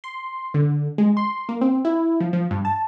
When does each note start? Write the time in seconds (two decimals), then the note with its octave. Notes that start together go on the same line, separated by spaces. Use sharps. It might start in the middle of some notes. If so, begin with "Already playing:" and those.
0.04 C6
0.54 D3
0.98 G#3
1.17 C6
1.49 A#3
1.61 C4
1.85 E4
2.20 F3
2.33 F3
2.51 G2
2.65 A5